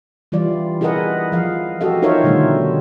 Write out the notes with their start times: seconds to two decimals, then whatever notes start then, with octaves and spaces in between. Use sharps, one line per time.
0.32 E3 G3 F4 D5
0.81 E4 G#4 A#4 B4 D#5 F#5
1.32 F3 F5
1.81 F#4 G4 A4 D#5 F5
2.02 D#4 F4 A#4 C5 C#5 E5
2.24 B2 D3 D#3 G3 A3